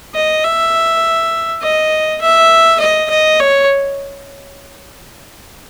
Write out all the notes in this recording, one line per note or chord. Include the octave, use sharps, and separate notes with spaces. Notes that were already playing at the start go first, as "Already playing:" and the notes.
D#5
E5
D#5
E5
D#5
D#5
C#5